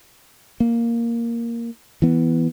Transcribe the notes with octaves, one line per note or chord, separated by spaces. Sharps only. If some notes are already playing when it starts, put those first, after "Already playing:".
A#3
E3 B3